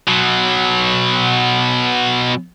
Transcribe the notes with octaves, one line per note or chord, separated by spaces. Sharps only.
B2 F#3